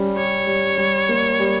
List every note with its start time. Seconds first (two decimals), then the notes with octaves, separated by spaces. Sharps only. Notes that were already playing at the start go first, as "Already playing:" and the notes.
Already playing: G3 C#4
0.16 G4 C#5
0.47 G3
0.78 G3
1.09 A#3
1.40 G3